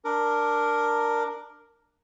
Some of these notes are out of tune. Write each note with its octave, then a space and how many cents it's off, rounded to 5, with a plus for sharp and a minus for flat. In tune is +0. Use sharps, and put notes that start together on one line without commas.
D4 +5 A#4 +0